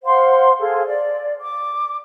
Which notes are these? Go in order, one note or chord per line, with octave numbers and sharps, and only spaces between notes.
C5 F5 F#5 C6
G#4 A4 F5
D5
D6